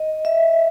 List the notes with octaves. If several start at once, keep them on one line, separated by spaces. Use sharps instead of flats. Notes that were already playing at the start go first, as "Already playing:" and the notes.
Already playing: D#5
E5